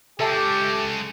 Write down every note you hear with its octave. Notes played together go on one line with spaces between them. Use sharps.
G#3 C#4 G4 A4 E5 A5